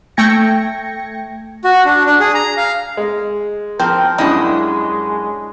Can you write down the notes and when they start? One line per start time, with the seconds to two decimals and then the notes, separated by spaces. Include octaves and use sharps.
0.17 A3 G5 G#6 A#6 C#7
1.64 F#4
1.85 D4
2.06 D4
2.20 G#4
2.34 A#5
2.57 F5
2.97 G#3
3.80 F3 C4 A#4
4.18 F#2 G3 G#3 C#4 D4 E4 D#5